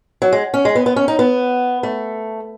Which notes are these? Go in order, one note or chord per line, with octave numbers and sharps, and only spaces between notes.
F#3
G#3
C#4
G#3
B3
B3
C#4
D#4
B3
A3